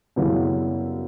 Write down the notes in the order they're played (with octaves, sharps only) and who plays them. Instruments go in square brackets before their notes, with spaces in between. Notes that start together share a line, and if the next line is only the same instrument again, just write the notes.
[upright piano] F#2 C#3 G3 B3 E4